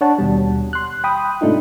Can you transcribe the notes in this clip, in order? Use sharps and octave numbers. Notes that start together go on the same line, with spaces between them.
D4 C#5 F#5 A5
D#2 B2 G3
C6 F#6
G5 B5 D#6
G#2 C3 A3 D4 D#4 F4